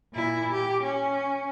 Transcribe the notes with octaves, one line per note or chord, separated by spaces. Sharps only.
A#2 E4
G4
C#4